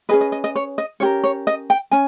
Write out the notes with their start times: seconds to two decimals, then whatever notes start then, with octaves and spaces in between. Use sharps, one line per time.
0.09 C#4 G#4 B4 D#5
0.21 D#5
0.32 D#5
0.44 D#5
0.56 C#5
0.78 D#5
1.00 C#4 G4 A#4 C#5
1.24 C#5
1.47 D#5
1.70 G5
1.91 C#4 G#5